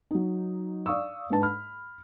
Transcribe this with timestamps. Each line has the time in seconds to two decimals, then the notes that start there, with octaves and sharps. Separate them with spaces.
0.11 F#3 D#4
0.86 D5 F5 C#6 D#6 E6
1.30 G#2 D4 B4 A5
1.42 B5 F6